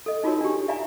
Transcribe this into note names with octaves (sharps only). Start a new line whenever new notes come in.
A4 D#5
D#4 F4 F#4 G#4 A#4 C#5
D4 G4
D5 E5 F5 G#5 A#5